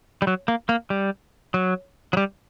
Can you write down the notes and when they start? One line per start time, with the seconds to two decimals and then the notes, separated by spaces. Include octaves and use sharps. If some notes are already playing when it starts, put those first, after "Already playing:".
0.22 G3
0.27 F#3
0.48 A#3
0.69 A#3
0.90 G3
1.54 F#3
2.13 F#3
2.17 G3